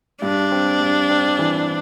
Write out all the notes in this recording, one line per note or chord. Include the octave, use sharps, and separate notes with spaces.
G2 D4
C4
G2
C4
E3